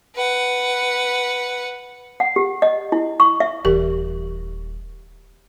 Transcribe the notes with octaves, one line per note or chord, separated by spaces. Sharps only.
B4 F#5
F#5
G4
D#5
E4
C#6
E5
D#1 E3 G4 A#4